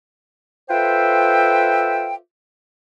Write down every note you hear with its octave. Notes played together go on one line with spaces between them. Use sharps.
F4 A4 B4 C5 E5 G5